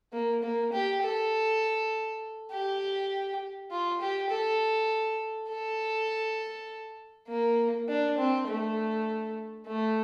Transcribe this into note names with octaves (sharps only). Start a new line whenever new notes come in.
A#3
A#3
G4
A4
G4
F4
G4
A4
A4
A#3
D4
C4
A3
A3